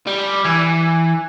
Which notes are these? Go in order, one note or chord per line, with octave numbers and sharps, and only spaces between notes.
G3
E3